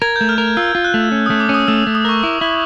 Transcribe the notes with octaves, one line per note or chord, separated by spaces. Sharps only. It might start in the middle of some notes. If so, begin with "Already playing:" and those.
A#4 G#6
A3 G6
F6
A#4
F4 E6
F4
F#6
A3
C#4
A3 D#6
D6
C#4
D#6
A3 E6
A3
D#6
A#4 C#6
E4 D6
E4